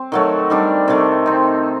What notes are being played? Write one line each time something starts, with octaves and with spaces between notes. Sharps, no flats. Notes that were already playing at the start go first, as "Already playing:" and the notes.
Already playing: C4
D#3 F#3 A3
D#3 G3 D4
C3 D#3 A3
C4 D#4